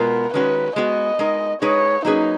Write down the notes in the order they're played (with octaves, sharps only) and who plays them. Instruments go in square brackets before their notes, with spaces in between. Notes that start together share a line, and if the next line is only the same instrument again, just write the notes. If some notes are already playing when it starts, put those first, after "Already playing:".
Already playing: [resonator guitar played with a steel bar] B2 G#3 B3 F4 [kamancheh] A#4
[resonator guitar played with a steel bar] D#3 G#3 C#4 F#4 [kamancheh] B4
[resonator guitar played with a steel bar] G#3 B3 F#4 [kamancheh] D#5
[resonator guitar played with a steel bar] G#3 D#4 A#4
[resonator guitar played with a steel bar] G#3 D#4 G#4 B4 [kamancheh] C#5
[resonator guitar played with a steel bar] F#3 A#3 C#4 G#4 B4 [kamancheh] D#4